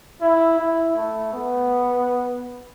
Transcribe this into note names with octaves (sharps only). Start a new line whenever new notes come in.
E4
E4
A3
B3